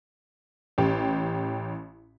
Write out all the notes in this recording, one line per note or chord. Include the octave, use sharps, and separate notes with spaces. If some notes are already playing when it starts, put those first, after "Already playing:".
A1 G4